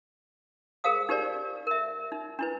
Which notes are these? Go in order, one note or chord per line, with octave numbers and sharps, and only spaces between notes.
G#4 A#4 C5 F5 D#6
D#4 G4 A#4 C5 D5
A#4 E5
D#4
D4 E4 B4